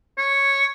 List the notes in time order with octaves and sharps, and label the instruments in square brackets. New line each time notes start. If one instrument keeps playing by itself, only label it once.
[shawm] C#5